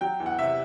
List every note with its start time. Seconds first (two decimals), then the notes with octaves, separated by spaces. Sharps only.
0.01 F#3 G5
0.20 E2
0.26 F#5
0.39 C3 E5